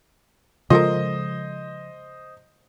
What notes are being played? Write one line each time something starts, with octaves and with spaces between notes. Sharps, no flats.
C#3 F3 G#3 F4 A4 A#4 C5 D#5